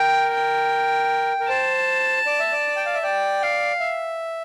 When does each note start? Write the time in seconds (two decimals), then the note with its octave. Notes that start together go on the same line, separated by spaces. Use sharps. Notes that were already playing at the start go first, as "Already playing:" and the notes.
Already playing: A#4 G5
0.33 G5
1.40 A#4
1.48 C5 A5
2.26 D5
2.40 E5
2.52 D5
2.76 G5
2.85 F5
2.94 E5
3.03 D5 G5
3.42 F5
3.80 E5